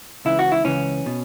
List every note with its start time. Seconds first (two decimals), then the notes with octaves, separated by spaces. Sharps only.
0.25 C#2 C#3 E3 E4
0.39 F#4
0.52 E4
0.65 C#2 C#3 E3 C#4
1.06 B2